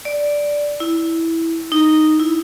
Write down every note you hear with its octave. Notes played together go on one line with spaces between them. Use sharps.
D5
E4
D#4
E4